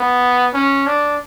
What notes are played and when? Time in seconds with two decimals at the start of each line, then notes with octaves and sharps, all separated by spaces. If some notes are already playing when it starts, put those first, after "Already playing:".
Already playing: B3
0.54 C#4
0.87 D4